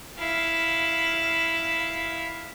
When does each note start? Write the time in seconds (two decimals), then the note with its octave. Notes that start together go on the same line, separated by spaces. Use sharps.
0.19 E4 F5